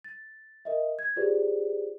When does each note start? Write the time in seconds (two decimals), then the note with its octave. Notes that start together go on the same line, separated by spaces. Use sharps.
0.04 A6
0.65 A#4 D#5 E5
0.99 G#6
1.16 F4 G4 G#4 B4 C5 D5